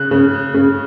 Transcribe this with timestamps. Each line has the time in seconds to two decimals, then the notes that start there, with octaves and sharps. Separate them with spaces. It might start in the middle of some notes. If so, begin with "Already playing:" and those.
Already playing: C#3 F#6
0.11 C#3
0.54 C#3